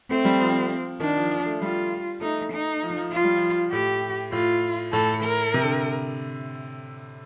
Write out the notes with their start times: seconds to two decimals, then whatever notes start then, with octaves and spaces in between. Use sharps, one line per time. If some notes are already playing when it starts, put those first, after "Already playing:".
0.10 A3 C4
0.25 G3
0.40 F3
1.00 D#3 D4
1.16 F3
1.30 F3
1.46 A3
1.61 G3 F4
2.21 A3 D#4
2.52 D#4
2.83 F3
2.97 F3
3.12 F3 F4
3.24 G3
3.36 F3
3.72 A2 G4
4.32 A2 F4
4.93 A2 A4
5.23 A#4
5.54 C3
5.64 D3